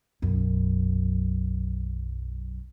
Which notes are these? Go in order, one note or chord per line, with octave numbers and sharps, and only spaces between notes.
B1 F#2